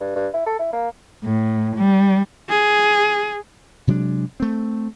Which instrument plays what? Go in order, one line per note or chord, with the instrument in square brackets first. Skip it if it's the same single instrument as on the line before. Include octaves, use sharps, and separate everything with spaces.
[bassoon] G2
G2
E4
A4
E4
A#3
[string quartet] A2
G3
[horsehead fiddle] G#4
[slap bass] C3 F#3 G#3 D4
A3 C4